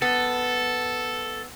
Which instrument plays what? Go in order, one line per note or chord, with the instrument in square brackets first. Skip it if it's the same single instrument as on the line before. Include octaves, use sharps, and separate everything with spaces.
[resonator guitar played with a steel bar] B3 [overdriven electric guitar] A4